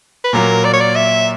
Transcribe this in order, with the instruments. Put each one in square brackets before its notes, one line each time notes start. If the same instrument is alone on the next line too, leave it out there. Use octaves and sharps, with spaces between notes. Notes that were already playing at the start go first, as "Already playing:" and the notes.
[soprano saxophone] B4
[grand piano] A#2 F#3 A#3 [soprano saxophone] A#4
[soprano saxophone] D5
C#5
D5
E5